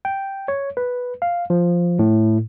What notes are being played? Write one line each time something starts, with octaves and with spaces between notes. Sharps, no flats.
G5
C#5
B4
F5
F3
A2